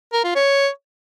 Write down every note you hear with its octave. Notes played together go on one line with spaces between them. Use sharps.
A#4
F4
C#5